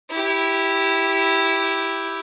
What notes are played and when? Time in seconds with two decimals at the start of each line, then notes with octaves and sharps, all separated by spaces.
0.10 E4 G4